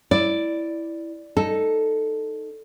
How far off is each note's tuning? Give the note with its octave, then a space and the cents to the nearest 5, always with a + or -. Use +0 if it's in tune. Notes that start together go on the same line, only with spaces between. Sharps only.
E4 +0 D5 +0
D#4 +0 A4 +0